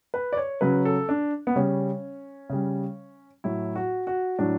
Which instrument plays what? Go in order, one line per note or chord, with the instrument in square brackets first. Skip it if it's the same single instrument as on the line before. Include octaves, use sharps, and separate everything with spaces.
[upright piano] B4
D5
C#5
C#3 F#3 B4
A4
D4
B3
C#3 G3 C#4
C#3 G3
A2 F#3 E4
F#4
F#4
A2 F#3 D4